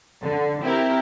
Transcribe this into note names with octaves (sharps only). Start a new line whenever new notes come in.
D3
C4 E4 G4 A#4